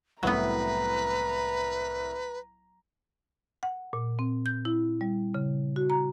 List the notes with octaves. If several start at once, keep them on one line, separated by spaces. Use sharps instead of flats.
C2 A2 F#3 B3 B4 A#5
F#5
A#2
C4
G6
E4
G3
C#3
F#4
A#5